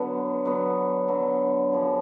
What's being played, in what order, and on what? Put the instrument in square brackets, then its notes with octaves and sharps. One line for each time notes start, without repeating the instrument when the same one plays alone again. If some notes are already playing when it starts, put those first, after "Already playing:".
Already playing: [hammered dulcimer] D3 F#3 B3
D3 F#3 B3
D3 F#3 B3
F#2 C#3 F3